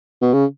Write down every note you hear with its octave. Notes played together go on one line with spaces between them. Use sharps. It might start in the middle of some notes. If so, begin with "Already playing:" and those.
B2
C#3